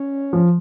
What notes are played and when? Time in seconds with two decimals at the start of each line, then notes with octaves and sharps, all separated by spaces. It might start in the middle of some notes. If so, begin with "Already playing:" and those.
Already playing: C#4
0.33 F3